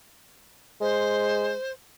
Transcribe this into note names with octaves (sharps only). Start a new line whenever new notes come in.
G#3 C5